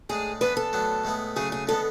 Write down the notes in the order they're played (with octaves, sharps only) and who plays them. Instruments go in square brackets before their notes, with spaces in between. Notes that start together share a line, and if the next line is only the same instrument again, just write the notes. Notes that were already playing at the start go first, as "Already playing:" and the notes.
[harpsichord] A2 G#3 D4 [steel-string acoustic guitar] G#4
[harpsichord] E3 B3 D4 [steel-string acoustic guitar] B4
[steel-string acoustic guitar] A4
[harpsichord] A2 F#3 B3 D4
A2 G#3 B3 E4
[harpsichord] C#3 F#3 A3 [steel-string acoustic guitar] G#4
[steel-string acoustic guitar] G#4
[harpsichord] D3 G#3 B3 [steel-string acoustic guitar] A4